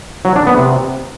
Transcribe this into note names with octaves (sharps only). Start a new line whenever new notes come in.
F#3
D4
B3
C3